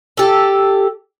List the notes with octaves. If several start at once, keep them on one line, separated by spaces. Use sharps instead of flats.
G4 A4